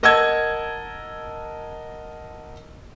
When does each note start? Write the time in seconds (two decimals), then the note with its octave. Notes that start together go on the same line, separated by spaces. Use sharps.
0.03 A#4 D#5 F#5 A5 E6 G#6